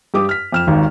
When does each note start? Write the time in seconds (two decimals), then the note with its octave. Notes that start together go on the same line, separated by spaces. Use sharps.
0.14 G2 G4 D6 D#6
0.29 F6 B6
0.52 F2 F6 E7
0.67 G#1 D#2 D#3